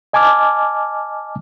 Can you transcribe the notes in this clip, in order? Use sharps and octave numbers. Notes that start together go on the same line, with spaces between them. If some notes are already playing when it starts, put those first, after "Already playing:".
D#5 G#5 A5 D6 F6